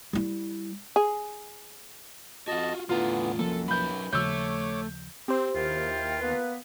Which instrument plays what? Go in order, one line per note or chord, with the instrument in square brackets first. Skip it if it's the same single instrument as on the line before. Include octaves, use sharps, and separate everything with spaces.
[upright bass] G3 E4
[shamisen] G#4
[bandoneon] F2 D#5 A5 [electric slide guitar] F4 F#4
[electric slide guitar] E2 A2 A#5 [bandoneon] D3 E3 B3 [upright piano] F4
[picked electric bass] C2 F3 A#3 [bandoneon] F#2 [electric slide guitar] A4
[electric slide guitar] F#3 D#4 B4 [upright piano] B5 G6
[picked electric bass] D#2 C#3 F3 [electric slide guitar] A3 [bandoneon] C#5 D6 [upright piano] E6 G6
[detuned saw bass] C4 [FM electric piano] G4 C5
[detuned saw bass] D#2 [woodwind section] E4 A#4 G5 [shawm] F4
[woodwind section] A#3 B3 B4